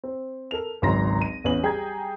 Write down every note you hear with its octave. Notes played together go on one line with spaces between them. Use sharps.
C4
A4 A#4 F7
G#1 C#2 F#3 A#5 C6 A#6
D#7
A1 E2 C#4 B4 F#7
G3 G#4 G5 G#5 A#5 G#6